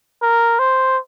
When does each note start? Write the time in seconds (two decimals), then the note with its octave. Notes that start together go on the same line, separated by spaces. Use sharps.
0.22 A#4
0.59 C5